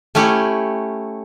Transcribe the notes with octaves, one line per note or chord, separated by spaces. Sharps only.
A3 C#4 E4 G4